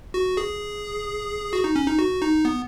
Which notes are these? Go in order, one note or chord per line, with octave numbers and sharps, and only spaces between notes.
F#4
G#4
F#4
D#4
C#4
D#4
F#4
D#4
B3